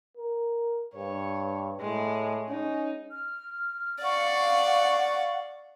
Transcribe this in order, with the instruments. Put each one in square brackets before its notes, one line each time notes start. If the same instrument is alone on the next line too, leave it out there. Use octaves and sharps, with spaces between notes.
[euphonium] A#4
[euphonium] G2 [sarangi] C#5
[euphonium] A2 [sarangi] G#3
[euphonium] C#4 [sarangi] D#4
[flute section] F6
[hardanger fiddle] D5 [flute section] F5 F#5 C#6